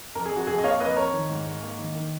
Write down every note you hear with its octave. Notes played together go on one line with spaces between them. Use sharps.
F2 A#4
G#4
F2
F#4
F2 G#4
D#5
A#3 C#5 F5
F2 B4 D#5
F2 A#4 C#5
D#3
G#2
G#2
A#3
D#3
D#3